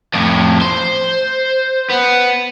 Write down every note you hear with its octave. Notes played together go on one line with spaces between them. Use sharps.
F2 A2
C5
B3